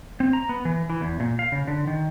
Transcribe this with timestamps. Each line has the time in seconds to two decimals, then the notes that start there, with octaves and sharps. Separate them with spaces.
0.20 C4
0.33 A#5
0.49 B3
0.65 E3
0.90 E3
1.01 E2
1.20 A#2
1.39 F5
1.52 C#3
1.67 D3
1.87 D#3